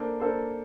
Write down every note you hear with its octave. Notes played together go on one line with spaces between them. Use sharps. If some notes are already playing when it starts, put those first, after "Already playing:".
Already playing: A#3 D4 A4 C5
A#3 D4 A4 C5